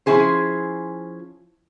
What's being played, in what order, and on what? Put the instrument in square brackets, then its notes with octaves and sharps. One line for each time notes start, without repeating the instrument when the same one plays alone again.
[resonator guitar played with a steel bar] F3 B3 C#4 E4 G#4 C5